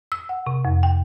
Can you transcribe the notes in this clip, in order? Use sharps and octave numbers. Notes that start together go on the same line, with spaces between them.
E6
F#5
C3
F2
G5